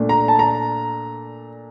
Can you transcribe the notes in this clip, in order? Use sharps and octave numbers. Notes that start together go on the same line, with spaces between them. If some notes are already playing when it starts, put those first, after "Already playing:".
Already playing: A#2 A3 D4
A#5
A5
A#5